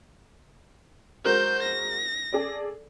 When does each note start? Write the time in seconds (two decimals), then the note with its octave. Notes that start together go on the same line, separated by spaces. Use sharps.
1.25 G#3 F#4 A#4 C5 G6
1.64 A#6
2.33 G#4 A4 D5